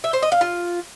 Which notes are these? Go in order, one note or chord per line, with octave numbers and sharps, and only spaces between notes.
E5
C5
D#5
F5
F4